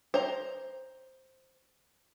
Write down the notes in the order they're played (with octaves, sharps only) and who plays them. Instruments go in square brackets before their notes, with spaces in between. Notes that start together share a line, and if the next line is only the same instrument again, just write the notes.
[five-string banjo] C5 A#5